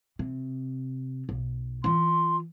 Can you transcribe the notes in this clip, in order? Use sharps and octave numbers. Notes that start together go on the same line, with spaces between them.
C3
B1
E3 F4 C6